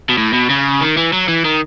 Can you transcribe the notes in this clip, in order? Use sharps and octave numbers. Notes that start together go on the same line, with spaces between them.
B2
A2
B2
C#3
D#3
E3
F#3
E3
D#3